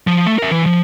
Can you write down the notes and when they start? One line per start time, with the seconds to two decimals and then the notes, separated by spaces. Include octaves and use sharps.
0.07 F3
0.26 A3
0.39 A#4 E5
0.51 E3
0.66 F3